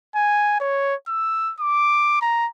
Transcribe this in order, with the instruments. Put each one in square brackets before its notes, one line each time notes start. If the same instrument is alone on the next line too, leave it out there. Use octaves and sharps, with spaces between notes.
[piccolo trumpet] G#5
C#5
E6
D6
A#5